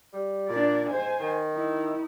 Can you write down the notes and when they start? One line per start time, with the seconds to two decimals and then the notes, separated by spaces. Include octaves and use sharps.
0.13 G3
0.49 A#2 D4 D5
0.89 G#2 C5 G#5
1.20 D#3
1.51 D#4 E4